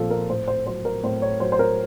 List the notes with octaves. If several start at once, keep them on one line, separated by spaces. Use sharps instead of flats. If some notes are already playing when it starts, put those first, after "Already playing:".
Already playing: A#2 F3 F4 A4
A#4
A2 C5
C5
F#3 C5
A#4
A2 C5
C#5
F#3 C5
C5
A#4